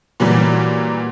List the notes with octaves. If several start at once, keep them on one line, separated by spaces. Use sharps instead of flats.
A#2 E3 F#3 G3